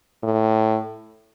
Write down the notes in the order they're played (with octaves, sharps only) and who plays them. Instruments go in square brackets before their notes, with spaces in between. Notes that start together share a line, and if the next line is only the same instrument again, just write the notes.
[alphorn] A2